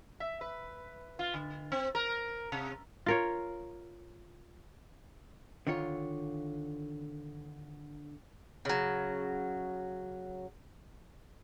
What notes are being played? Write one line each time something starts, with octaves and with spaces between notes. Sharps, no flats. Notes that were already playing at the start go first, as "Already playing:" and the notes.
E5
B4
F4
D3
C4
A#4
C3
F4 A#4 C#5
D3 D#3 F4 C#5
C#3 F#3